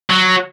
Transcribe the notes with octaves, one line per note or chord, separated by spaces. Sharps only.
F#3